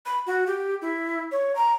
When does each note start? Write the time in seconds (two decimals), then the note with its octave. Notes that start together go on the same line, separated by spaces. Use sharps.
0.06 B5
0.26 F#4
0.46 G4
0.82 E4
1.32 C#5
1.56 A#5